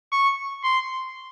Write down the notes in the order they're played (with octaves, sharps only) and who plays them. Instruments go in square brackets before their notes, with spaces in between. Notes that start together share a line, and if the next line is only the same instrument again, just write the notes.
[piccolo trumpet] C#6
C6